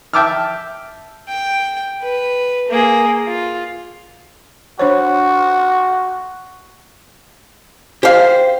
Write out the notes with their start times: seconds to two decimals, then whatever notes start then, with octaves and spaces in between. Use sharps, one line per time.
0.13 E5 G5 A5 D6 E6 F6
1.29 G5
2.01 B4
2.69 A#3 G#4
3.26 F4
4.79 D4 F#4 C5 C#5
8.03 G4 C5 F5